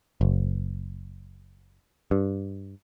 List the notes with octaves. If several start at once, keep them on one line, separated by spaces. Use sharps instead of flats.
F#1
G2